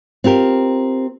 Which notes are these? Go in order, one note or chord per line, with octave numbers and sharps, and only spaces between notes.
C4 F4 G4 A#4